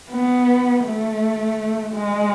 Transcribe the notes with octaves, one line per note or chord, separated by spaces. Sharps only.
B3
A3
G#3